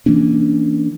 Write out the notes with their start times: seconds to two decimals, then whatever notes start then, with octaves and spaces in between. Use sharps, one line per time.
0.06 E3 A#3 C#4 D4